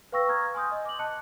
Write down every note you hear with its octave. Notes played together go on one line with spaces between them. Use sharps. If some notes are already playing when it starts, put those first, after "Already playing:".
B4 F5 G5 C#6 E6 A#6
A#5 C#6 D#6 F6 G#6
G#5 C6 D#6 G6
D#5
D6 F#7
D#5 A5 F#6 C#7